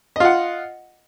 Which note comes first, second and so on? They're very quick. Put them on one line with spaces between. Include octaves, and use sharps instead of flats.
D#5 F4 F#5